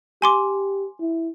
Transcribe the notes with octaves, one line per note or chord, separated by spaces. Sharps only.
G4 G#5 C6 D6
E4